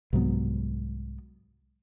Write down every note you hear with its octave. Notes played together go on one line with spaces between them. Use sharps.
C2 G#2 F#3 B3